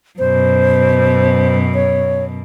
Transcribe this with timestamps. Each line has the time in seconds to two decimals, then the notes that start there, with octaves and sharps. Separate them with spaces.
0.19 F#2 B2 C5
1.74 C#5